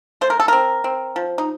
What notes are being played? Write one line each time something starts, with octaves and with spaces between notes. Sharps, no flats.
A3 C5
A#4
A4
C4 A#4
C4
F3
D#4